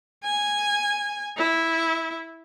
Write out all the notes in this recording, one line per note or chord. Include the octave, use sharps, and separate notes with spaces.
G#5
E4